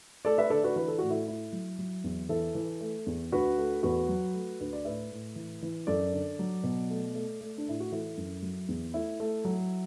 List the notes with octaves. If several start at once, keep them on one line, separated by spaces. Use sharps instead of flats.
A3 A4 D5
B4 E5
D3 A4 D5
F#4 B4
E3 B4
A4
A2 F#4
E4 A4
A3 E4
F#3
F#3
E2
E3 E4 A4
E3
A3
E2
D2 F#4 B4
A3
E2 F#4 B4
F#3
A3
D2 B4
D5
A2 B4 E5
A2
E3
E3
F#2 A4 D5
D3
F#3
B2
A3
A3
A3
D4
A2 E4
F#4
E3 E4 A4
F#2
F#3
E2
A3 E4
A3
F#3